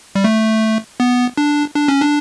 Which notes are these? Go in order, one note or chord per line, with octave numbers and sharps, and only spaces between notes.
G3
A3
B3
D4
D4
C#4
D4